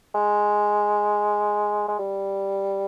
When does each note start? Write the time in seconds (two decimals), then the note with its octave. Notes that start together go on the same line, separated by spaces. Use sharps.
0.14 G#3
1.88 G#3
1.99 G3